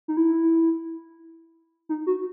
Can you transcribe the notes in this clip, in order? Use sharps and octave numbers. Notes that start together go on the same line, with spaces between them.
D#4
E4
D#4
F#4